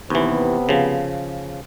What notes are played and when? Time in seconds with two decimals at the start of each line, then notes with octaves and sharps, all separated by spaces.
0.10 D#2 C3 E3 B3
0.69 C#3 F3